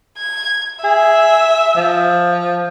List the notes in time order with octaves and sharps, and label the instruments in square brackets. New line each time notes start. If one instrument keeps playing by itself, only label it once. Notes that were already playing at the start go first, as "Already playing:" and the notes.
[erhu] G#6
[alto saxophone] G#4 [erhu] E5
[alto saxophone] F3